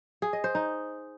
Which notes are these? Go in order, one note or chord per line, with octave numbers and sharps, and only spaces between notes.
G#4
D#5
C5
D#4